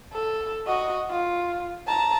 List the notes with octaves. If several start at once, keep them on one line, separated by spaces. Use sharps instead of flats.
A4
F#4 D#5
F4
A5 A#5